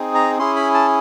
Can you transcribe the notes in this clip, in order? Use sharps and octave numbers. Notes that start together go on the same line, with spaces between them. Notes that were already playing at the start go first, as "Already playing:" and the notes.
Already playing: C4 D#4 G#4
A#5
C#4 E4 G#4 C6
B5
A5